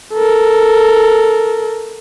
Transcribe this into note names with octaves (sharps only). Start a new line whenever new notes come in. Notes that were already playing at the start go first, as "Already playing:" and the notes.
A4 A#4